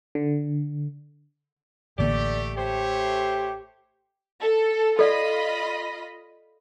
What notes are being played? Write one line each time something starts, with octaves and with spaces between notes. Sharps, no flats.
D3
A1 D3 A3 A#3 G4 D5
A3 G4 C5 C#5
A4
F4 A4 D5 D#5 B5